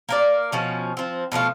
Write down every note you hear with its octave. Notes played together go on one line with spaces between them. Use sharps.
A#3 A#4 D5
B2 F3 C#4
F3 C4
B2 F3 A3 F4